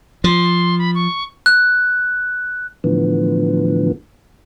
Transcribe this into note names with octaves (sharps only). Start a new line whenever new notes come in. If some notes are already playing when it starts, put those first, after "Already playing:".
F3 C6
B5
C#6
F#6
A2 D3 E3 F3 B3